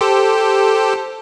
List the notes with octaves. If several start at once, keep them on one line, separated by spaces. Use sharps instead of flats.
G4 A4 C5